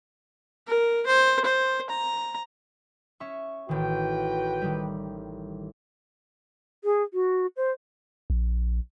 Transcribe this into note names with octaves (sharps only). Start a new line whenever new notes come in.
A#4
C5
C5
A#5
C#4 E5 C#6
A1 D#3 F#4 B4 G5
D#3 G3
G#4
F#4
C5
A#1